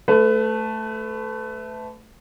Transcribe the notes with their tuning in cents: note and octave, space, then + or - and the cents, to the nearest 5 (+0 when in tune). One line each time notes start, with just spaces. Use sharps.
A3 +0 B4 +30